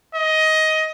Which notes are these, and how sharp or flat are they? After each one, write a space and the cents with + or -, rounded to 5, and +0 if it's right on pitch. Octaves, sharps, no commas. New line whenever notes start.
D#5 +15